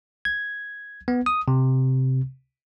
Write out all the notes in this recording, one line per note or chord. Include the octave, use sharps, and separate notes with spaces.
G#6
B3
D#6
C3